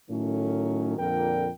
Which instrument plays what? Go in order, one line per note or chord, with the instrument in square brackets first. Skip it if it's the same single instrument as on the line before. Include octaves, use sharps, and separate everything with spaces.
[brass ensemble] A2 D#3 F#3 A3 C#4
F2 A#2 D3 A#4 G5